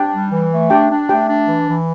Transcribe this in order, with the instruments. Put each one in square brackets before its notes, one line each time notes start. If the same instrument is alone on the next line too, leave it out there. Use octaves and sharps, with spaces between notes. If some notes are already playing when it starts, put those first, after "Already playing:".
Already playing: [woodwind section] D4 [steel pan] G4 G5
[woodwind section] G3
E3
A3
[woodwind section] D4 [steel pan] G4 G5
[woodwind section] D4
[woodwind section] A3 [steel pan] G4 G5
[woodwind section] D4
E3
E3